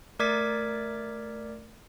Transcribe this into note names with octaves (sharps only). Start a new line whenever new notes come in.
A3 A#4 D5 D6 G#6 B6